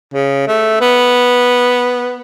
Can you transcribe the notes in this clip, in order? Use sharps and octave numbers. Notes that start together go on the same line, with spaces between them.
C#3
A3
B3